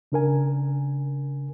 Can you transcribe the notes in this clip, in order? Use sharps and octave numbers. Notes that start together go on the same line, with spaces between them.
C#3 D4 A#4 G#5